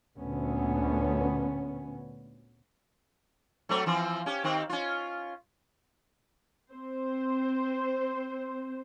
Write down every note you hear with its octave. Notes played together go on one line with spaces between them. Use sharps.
D2 A#2 B3 C#4
F#3 A3 C4
E3 F3 C4
C#4 G4
D#3 C4 G4
C#4 F4
C4 C5